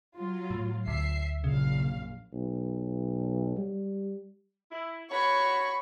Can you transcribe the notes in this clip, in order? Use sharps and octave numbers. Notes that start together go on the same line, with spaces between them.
F#3 F4
A2
D2 E5 C7
A#1 F#2 C#3 F5
B1
G3
E4
F#4 C#5 B5 C#6